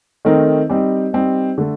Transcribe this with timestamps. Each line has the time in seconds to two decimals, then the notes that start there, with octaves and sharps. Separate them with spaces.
0.25 D#3 A3 C4 D#4 A#4
0.70 G3 C4 D#4
1.13 G3 C4 D#4
1.58 D3 A3